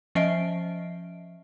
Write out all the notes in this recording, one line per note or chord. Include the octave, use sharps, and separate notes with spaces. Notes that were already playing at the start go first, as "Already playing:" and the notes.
F3 C#4 D#5 E5 C7 D7